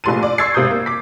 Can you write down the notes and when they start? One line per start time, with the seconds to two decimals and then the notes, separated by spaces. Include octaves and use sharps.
0.04 A#1 A2 C3 C6 A6 D#7
0.23 D5
0.38 C6 C#6 E6 G#6 A6 C7
0.54 G#1 C3 D#6 G6
0.71 A#3
0.86 D6 B6